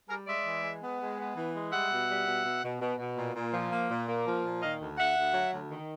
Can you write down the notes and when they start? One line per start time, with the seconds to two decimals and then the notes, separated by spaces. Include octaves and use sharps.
0.09 G3 G#4 A#4
0.27 G#3 D5 E5
0.45 E3
0.63 G#3
0.82 B3
1.00 G#3
1.18 B3
1.36 E3
1.54 G#3
1.72 G3 E5 F#5
1.90 B2
2.09 G3
2.26 B2
2.45 B2
2.63 B2
2.80 B2
2.99 B2
3.17 A#2
3.35 A#2
3.53 F3
3.71 A#3
3.90 A#2
4.08 A#3
4.26 F3
4.44 A#2
4.61 D#3 D#5 F5
4.80 D2
4.98 D2 E5 F#5
5.16 D2
5.34 F#3
5.52 D2
5.70 D#3